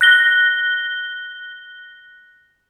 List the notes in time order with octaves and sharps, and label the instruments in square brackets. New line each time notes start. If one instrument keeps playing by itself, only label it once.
[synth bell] F#6 A#6 G7